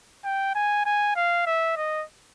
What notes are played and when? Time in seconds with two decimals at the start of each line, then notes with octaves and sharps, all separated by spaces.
0.25 G5
0.55 G#5
0.86 G#5
1.16 F5
1.46 E5
1.77 D#5